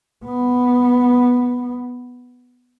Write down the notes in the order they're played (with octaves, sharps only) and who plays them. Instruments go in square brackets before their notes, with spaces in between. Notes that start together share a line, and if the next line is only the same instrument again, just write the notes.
[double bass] B3